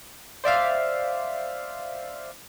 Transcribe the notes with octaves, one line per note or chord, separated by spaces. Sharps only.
C5 D5 E5 F5